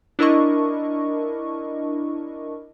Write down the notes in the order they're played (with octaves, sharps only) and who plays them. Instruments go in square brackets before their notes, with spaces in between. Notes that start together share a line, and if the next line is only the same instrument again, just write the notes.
[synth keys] D4 E4 A#4 D#5 C#6